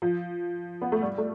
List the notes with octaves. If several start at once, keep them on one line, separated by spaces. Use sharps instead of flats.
F3
B3
A3
G3
A3